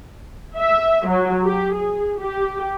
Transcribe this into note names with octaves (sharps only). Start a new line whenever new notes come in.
E5
F#3
G4
G#4
G4